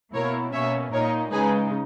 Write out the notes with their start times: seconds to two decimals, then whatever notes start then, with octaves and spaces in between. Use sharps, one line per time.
0.14 B2 A#3 E4 A#4 C#5
0.53 B2 A#3 C#4 C#5 E5
0.93 A#2 A#3 D#4 A#4 C#5
1.32 C#3 G#3 D#4 G#4 B4